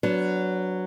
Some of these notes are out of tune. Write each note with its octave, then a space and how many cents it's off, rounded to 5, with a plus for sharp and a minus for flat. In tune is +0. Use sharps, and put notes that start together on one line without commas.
F#3 +0 B3 +0 D4 -20